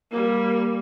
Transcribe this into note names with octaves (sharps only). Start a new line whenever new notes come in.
G3 A#3